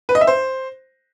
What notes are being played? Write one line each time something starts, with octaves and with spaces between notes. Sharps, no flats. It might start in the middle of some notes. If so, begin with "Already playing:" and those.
B4
D#5
E5
C5